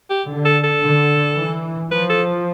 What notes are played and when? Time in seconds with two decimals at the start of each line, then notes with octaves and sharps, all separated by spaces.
0.10 G4
0.28 D3
0.45 A4
0.64 A4
0.82 D3
1.37 E3
1.91 F3 B4
2.09 A4